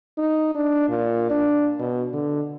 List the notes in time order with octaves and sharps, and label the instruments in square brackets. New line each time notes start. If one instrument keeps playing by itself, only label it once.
[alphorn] D#4
D4
A#2
D4
B2
D3